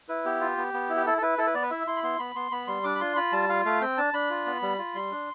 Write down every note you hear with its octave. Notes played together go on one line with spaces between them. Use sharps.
E4 B4
B3 G4
F4
B3
B3
E4
G4
E4 A4
A4
E4 B4
E4 A4
B4
B3 D5
B4
E4 E5
E4 C6
B5
B3 C6
B3 B5
B3 C6
B3 B5
G3 C6
D4 D6
B5
F4 C6
F4 B5
G3 A5
F4 F5
A3 F5
C4 G5
D4 A5
D4 B5
F4
B3
G3
F4
G3 C6
D4